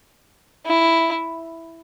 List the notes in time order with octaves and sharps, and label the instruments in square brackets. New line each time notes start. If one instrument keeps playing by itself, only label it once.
[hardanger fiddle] E4